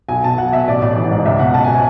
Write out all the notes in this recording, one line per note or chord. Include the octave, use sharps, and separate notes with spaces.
B1 G#5
B2 A5
B1 F#5
B2 E5
A1 D5
A1
E3
G#2
C#2 E5
B2 F#5
C#2 A5
G#5
B2
G#5